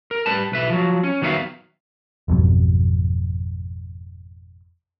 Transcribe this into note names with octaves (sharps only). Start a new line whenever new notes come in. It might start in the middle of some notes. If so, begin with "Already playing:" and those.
A#4
G3 B4 A5
B1 B4 E5
F3 F#3
C#4
D#3 F#3 B3 C#5 E5 F5
G#1 F2 B2 F#3